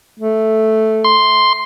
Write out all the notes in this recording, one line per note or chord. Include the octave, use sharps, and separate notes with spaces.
A3
C6